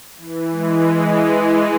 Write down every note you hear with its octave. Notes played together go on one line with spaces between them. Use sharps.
E3
G#3